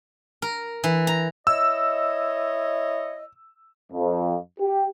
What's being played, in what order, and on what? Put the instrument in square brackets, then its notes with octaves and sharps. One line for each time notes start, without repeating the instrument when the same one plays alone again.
[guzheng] A#4
E3
A#5
[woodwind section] E4 C#5 D#5 [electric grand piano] E6
[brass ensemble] F2
G4